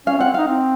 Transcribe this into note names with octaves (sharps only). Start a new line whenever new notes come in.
C#4 F5
C4 F#5
D#4 F5
C4